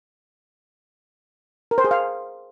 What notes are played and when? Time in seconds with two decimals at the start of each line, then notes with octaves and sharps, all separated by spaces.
1.71 A#4
1.78 C5
1.84 G#4
1.91 F5